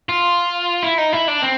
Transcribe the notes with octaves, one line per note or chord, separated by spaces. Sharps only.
F4
E4
D#4
E4
D4
C4